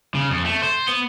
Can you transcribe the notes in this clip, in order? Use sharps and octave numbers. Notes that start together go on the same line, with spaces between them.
C#3
F2
A3
C5
B3